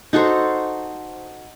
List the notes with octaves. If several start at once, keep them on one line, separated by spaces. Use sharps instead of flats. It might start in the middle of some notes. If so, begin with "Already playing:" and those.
D#4 F#4 A4 C5